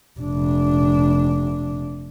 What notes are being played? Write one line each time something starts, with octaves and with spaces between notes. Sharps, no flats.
F1 D4